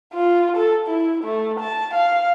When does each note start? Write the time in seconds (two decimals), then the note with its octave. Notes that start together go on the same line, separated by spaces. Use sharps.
0.13 F4
0.57 A4
0.87 E4
1.24 A3
1.60 A5
1.94 F5